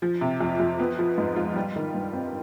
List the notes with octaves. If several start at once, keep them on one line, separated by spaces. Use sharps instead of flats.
F3
C3
F2
F2
B3
F3
G#2
F4
G3
D#3
G2
C4